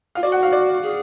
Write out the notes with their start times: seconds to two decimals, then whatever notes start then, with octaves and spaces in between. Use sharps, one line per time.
0.15 F4 F5
0.23 F#4 D5
0.32 F#5
0.43 F5
0.53 D5
0.82 G#4